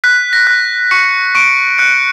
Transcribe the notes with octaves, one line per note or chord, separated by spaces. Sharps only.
F#6 B6
A#6
F#6
C#6 C#7
C#6 D7
F#6 C#7